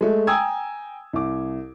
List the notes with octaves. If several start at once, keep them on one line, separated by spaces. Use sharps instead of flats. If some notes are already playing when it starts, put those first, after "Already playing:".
G#3 A3
G5 G#5 A#5 D#6 E6 G#6
C2 D6